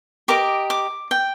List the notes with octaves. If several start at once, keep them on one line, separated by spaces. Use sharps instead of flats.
G4 A#4 D#5 D6
D6
G5